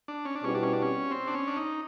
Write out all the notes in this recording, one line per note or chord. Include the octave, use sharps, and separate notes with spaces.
D4
C#4
D4
B2 G3 C4 C#4 E4 G4
D4
C#4
D4
C#4
C4
D4
C#4
D4
D#4